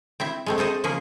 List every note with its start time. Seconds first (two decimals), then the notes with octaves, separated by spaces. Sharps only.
0.20 C4 E4 E5
0.46 G#3 A3 C4
0.58 G#3 A4 C5 D#5
0.84 C#3 F3 A#3 C#4 G#4